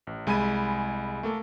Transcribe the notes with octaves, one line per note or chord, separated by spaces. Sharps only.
A1
C2 G#3 G#5 B5 G#6 D#7
A3 A#3 A4